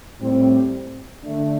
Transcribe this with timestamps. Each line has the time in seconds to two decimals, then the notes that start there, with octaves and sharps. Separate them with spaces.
0.20 A2 G3 C4
1.23 D3 A3 D4